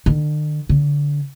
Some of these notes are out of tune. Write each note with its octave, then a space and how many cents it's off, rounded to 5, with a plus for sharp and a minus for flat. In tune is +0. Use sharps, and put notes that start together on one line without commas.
D3 +45
D3 -20